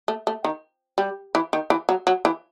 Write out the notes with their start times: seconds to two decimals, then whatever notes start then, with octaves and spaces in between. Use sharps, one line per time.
0.08 A3
0.27 A3
0.44 D#3
0.98 G3
1.35 E3
1.53 D#3
1.70 E3
1.89 F#3
2.07 F#3
2.25 E3